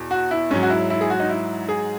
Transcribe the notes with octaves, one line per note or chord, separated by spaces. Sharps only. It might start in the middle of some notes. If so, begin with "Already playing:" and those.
Already playing: E2 B2
F#4
E4
G#2 F#3 C#4
F#4
E4
E4
G#4
F#4
D#4
E4
G#4